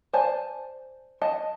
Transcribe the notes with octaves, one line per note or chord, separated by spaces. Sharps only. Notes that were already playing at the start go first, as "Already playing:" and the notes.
C5 D5 G#5 A5
D#5 A5